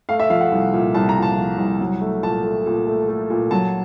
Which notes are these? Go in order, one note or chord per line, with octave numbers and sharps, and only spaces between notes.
A3 F5
E5
F3 F5
F#5
C2
A#2
C2 A5
A#5
A#2
A5
F3
C2
F#3
A3
A#2 A5
A3
A#2
A3
A3
A#2
F#3 A5